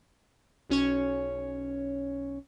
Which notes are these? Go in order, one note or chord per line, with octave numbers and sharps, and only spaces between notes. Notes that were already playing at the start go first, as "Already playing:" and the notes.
B1 C#4 C#5